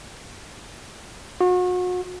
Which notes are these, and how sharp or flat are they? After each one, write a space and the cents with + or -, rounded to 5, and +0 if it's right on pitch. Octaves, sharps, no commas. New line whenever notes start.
F#4 -35